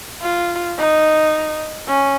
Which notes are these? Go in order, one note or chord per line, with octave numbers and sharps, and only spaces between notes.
F4
D#4
C#4